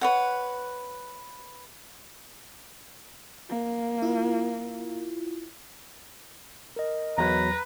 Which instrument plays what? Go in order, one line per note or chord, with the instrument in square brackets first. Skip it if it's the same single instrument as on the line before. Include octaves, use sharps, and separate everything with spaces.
[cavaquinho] B4 C#5 F#5
[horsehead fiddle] A#3
[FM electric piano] E4 F4
[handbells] A#4 D#5
[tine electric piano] E2 F#3 [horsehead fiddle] B4 [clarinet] A#5